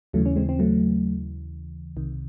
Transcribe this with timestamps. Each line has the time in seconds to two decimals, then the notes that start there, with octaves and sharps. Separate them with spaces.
0.13 D#2 C#3 E3 F#3 A3
0.26 C#4
0.36 G#3 C4
0.49 C4
0.59 F#3 A3
1.96 C2 C3 D#3